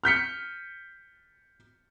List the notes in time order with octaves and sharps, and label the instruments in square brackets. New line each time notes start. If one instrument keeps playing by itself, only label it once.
[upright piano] F6 G6 B6 C#7